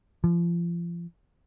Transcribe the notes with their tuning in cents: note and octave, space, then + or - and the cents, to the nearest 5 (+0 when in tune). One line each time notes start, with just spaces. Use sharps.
F3 -30